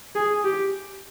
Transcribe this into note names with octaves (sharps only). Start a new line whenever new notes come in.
G#4
G4